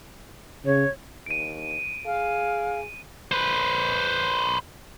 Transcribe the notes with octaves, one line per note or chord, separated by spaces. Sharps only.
C#3 C#5
D#2 D7 D#7
G#4 F5
B4 C5